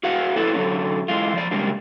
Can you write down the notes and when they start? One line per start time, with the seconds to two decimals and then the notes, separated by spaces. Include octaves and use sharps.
0.03 F#4 G#4 B4 F5 F#5
0.36 A#3 E4 A4 B4
0.54 D3 F#3 C#4 A4
1.08 E3 G#3 F4
1.34 F3 D5
1.51 C#3 G3 G#3 A#3 D4